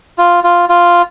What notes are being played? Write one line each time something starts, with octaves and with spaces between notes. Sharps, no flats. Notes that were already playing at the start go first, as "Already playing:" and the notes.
F4
F4
F4